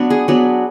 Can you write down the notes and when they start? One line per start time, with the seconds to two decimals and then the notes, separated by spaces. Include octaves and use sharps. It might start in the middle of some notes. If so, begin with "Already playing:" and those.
Already playing: F#3 B3 D4
0.10 G#4
0.28 F#3 B3 D4